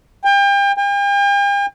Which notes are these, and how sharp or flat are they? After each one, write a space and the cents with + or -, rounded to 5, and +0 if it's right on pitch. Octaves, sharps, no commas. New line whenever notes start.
G5 +35
G5 +45